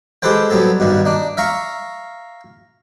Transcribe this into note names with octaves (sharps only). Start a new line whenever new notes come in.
G#3 G4 A4 B4 C5 G5
F#3 G3 B3 C4 A4
G2 B2 D#3 G3
D4 D#4
E5 F5 A#5 C#6